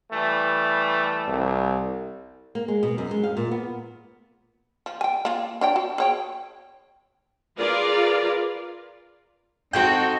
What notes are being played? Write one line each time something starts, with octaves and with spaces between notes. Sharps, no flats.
E3 G3 A3
C2
A#3
G#3
B2
F#2
G#3
F5
A#2
B3
F3
G5 G#5
A#3 F4
D4 C#5 G5
F#4
G#4 C#5 G5
F4 G#4 A#4 B4 D5 F5
C4 D#4 F#4 A4 G5